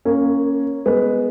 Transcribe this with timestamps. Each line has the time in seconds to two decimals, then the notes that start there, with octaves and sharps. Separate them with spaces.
0.05 A#3 C#4
0.86 G#3 B3